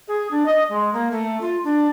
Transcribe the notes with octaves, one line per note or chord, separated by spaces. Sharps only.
G#4
D4
D#5
G#3
A#3
A3
F4
D4